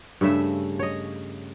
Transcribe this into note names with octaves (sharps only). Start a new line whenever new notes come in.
G2 C#3 A3 E5
C#5 D#5